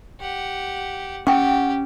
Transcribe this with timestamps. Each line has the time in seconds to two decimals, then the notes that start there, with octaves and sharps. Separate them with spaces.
0.21 G4 F#5
1.27 C#4 G4 F#5 G5 C#6